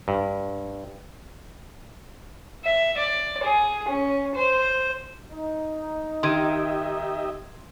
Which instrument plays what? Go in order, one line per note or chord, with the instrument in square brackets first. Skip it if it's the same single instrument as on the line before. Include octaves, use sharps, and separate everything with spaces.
[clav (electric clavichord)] G2
[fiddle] E5
D5
G#4
C#4
C5
[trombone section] D#4
[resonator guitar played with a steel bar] D#3 [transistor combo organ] G4 D#5 E5 [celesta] C6 G#6 D#7